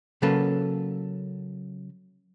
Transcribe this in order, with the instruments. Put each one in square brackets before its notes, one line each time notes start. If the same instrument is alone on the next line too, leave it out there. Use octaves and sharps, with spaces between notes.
[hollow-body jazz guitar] C#3 F#3 A#3 C#4 A4 B4